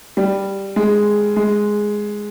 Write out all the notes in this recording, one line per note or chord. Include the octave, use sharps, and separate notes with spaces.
G3
G#3
G#3